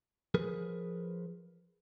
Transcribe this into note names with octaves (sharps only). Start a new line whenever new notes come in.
F3 G#4 A#4 B4